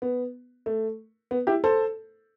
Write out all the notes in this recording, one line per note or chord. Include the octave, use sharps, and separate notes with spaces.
B3
A3
B3
E4 G4
A4 C5